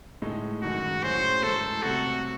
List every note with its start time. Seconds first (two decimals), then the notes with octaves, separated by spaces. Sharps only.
0.22 A2 G#3 D#4 A4
0.62 F#2 D#3 G#3 F#4
1.03 A2 F#3 C#4 G#4 C5
1.43 G#2 E3 A3 A4
1.83 C2 C3 F#3 A3 F#4